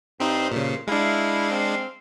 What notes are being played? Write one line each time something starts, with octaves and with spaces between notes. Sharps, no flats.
G2 C4 D#4 C5
A#2 C#3
G#3 D4 E4 F5
C4 F5